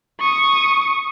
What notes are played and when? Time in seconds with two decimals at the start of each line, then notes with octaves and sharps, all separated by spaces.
0.20 C#6 D#6